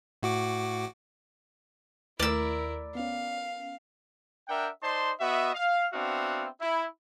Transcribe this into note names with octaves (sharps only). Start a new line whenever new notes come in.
A2 F#4 D6
D#2 A3 E4 A#4 D5 E6
B3 C#4 F5
D4 A#4 E5 F#5 G5
D#4 C5 D5 A5 C6
B3 F#4 D#5 E5
F5
B3 C4 D4 F#4 E5 F5
E4